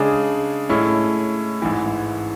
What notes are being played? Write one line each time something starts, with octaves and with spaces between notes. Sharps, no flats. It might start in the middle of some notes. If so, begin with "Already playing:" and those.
Already playing: C#3 G#3 D4 G#4
A2 G#3 C#4 E4
A1 G#2 E3